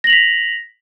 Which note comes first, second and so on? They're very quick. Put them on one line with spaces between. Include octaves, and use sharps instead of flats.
A#6 F#7 F7 B6